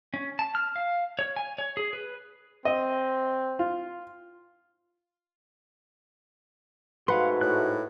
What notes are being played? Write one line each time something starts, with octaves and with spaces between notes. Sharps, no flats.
C#4
A5
F6
F5
C#5
G#5
C#5
G#4
B4
C4 D#5
F4
G#2 A3 F#4 B4 F5 F#5 C6
A2 F#6